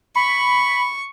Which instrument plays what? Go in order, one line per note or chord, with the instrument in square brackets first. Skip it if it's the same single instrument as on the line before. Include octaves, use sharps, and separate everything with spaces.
[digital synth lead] B5 [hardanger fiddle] C#6